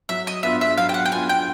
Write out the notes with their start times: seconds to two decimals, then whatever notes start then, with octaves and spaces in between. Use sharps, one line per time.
0.09 F#3 E5
0.27 D#5
0.43 B3 D4 F4 E5
0.61 E5
0.78 F#3 F5
0.89 G5
0.94 F#5
1.05 G5
1.12 B3 D4 F4 G#5
1.29 G5